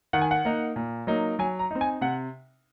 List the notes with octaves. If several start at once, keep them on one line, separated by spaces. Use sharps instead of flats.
D#3 F#5
G#5
F#5
A#3 D#4
A#2
F#3 A#3 D#4
F#3 G#5
A#5
C4 D#4
G#5
C3 F#5